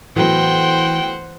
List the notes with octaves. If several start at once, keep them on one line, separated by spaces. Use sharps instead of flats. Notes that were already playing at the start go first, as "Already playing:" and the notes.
A2 E3 F#3 B3 C5 F#5 G5